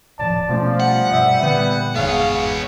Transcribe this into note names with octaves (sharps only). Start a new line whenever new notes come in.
D#1 A2 F3 D5 A5
B2 F3 A3 C#4
G3 F#5
G2 B2 E5
A#2 D3 E3 G3 B3
G1 E2 G#2 B3 G#4 C#5 F5